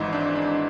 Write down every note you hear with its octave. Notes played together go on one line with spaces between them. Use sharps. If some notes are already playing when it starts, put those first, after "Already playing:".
Already playing: G#1 G#2 E3 D#4 E4
D4
D4